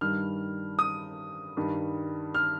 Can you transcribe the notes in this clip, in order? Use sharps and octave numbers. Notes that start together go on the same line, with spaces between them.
G2 D#3 G3 F6
D#6
G2 D#3 G3
F6